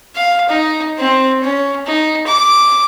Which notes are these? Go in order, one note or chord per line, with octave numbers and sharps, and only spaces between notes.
F5
D#4
C4
C#4
D#4
D6